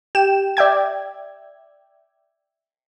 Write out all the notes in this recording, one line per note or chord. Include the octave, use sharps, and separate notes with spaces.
G4 G5 E7
D5 E5 G5 G#6